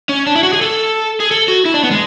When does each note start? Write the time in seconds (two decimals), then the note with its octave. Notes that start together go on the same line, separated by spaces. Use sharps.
0.09 C#4
0.26 D4
0.35 E4
0.43 F#4
0.53 G#4
0.61 A4
1.20 G#4
1.31 A4
1.48 F#4
1.65 E4
1.74 D4
1.83 B3
1.91 G#3